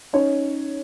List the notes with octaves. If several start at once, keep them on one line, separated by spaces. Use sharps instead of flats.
C#4 D#4 C#5